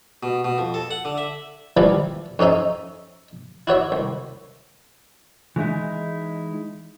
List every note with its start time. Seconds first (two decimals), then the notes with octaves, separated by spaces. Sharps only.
0.23 B2
0.44 B2
0.58 F2
0.74 A4
0.91 F#5
1.05 D3
1.18 E5
1.77 E3 F3 G3 E4 F4
2.39 F2 C#4 D#4 E5 G#5
3.67 E4 F#4 C#5 E5
3.92 C2
5.56 E3 G#3 D#4 E4